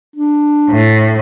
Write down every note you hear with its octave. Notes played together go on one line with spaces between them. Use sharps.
D4
A2